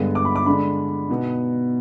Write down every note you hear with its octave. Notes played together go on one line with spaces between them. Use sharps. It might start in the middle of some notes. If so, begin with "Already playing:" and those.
Already playing: G2 D3 G#3 B3
D6
B5
D6
D3 G#3 D4 B5
B2 B3 D#4